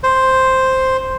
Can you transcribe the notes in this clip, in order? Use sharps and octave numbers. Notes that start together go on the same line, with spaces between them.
C5